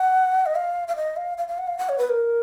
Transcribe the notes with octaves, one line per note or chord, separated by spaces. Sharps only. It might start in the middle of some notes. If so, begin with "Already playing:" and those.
Already playing: F#5
D#5
F5
F5
D#5
F5
F5
F5
F#5
F5
F#5
C#5
B4
A#4